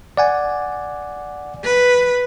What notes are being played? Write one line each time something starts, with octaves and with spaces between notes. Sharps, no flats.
D5 F#5 G#5
B4